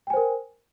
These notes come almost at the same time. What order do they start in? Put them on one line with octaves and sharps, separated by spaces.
G5 G#5 C5 A#4